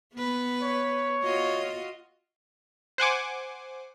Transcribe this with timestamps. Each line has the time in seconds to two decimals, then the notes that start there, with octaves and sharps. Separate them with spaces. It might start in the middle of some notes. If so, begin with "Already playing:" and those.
0.14 B3 B4
0.62 C#5
1.23 F4 F#4 D#5
2.98 C5 F#5 G#5 D6